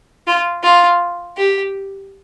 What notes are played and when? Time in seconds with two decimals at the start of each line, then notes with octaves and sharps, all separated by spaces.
0.27 F4
0.63 F4
1.37 G4